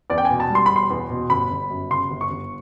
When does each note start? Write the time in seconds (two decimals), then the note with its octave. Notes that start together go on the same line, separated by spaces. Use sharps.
0.10 E2 D5
0.18 G5
0.25 G#5
0.30 B2
0.40 A5
0.50 G3
0.55 C6
0.66 E1 B5
0.76 C6
0.90 E2
1.10 B2
1.30 G1 B5
1.51 G1
1.70 F#2
1.90 C#3 C6
2.10 G1
2.21 C#6
2.31 G1